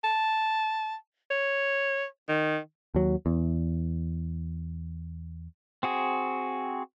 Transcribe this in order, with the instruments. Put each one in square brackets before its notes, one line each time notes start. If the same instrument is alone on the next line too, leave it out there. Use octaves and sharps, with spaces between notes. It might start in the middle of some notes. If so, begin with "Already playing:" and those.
[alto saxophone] A5
C#5
D#3
[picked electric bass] D#2 F#3
E2
[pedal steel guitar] C4 F#4 G#4